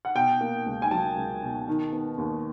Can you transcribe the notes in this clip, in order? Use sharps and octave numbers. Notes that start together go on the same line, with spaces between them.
F#5
B2 G5
A#3
C#2
G#5
F#3 A5
C#2
B2
D#3
B3
D#2